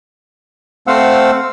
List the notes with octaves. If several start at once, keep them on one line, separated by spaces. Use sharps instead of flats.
A3 C4 C5 F5 F#5 E6